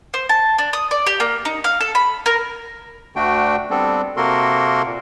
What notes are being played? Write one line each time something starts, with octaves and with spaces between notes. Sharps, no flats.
C5
A5
D4
D#6
D5
G4
A#3
D#4
F5
A4
B5
A#4
D2 D3 A3 D4 F#4 G5
G3 B3 C4 D4 A4
C3 A#3 F#4 A4 A#4 C6
A#2